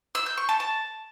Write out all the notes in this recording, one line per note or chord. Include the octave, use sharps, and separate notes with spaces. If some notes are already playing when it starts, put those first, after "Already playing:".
E6
G6
C#6
A5
A5